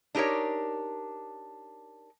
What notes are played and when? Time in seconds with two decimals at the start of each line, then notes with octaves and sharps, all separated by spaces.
0.15 D4 D#4 G4 A#4 C#5